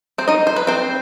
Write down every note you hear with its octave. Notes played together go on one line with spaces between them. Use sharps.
C4 C5
D#4 D#5
C5
B4
C4 C5